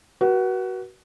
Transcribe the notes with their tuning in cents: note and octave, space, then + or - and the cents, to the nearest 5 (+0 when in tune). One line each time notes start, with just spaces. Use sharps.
F#4 +20 B4 -40